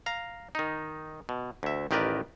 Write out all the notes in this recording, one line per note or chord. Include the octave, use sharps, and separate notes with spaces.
F5 A#5
D#3 D#4
B2
D2 E5
A1 D#3 G4 A#4 B4 D5